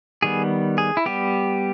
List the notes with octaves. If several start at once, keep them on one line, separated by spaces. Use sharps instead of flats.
D#3 G3 B3 G#4
G#4
E4
G3 B3 G4